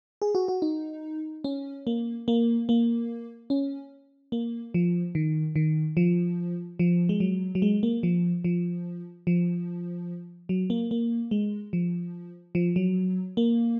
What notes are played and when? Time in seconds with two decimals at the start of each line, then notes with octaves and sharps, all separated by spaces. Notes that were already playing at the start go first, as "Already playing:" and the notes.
0.22 G#4
0.35 F#4
0.48 F#4
0.62 D#4
1.44 C#4
1.87 A#3
2.28 A#3
2.69 A#3
3.50 C#4
4.32 A#3
4.74 F3
5.15 D#3
5.56 D#3
5.97 F3
6.79 F3
7.09 G#3
7.20 F#3
7.55 F#3
7.62 G#3
7.83 A#3
8.03 F3
8.44 F3
9.27 F3
10.49 F#3
10.70 A#3
10.91 A#3
11.31 G#3
11.73 F3
12.55 F3
12.76 F#3
13.37 A#3